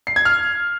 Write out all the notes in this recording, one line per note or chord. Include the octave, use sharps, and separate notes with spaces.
C7
G#6
F6